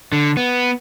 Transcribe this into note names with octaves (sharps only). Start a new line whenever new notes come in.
D3
B3